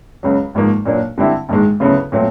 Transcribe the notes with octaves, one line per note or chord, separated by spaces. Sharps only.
C#2 C#3 F#3
G#1 G#2 F3 A#3
A#2 F#3 A#3 D4
D3 G3 C4 E4
A#1 G#2 D#3 G#3
D2 C#3 F#3 B3 E4
A#2 F#3 A3 C4